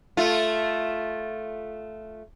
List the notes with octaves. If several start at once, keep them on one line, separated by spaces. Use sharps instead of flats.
A3 F4